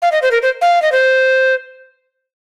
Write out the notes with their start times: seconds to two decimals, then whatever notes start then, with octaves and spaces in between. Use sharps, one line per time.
0.02 F5
0.12 D#5
0.22 C5
0.31 A#4
0.42 C5
0.61 F5
0.82 D#5
0.92 C5